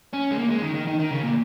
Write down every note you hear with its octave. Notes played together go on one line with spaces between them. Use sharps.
C#4
G#3
A#3
G#3
D#3
D#3
D#3
D#3
C#3
A#2